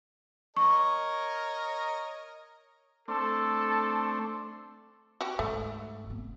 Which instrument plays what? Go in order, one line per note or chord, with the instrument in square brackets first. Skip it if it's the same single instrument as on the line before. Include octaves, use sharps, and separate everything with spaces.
[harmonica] A#4 C#5 D#5 [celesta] C#6
[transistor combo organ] A3 C4 D4 [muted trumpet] A4
[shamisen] F#4 G4
[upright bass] G#2 [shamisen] A3
[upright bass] F1 B3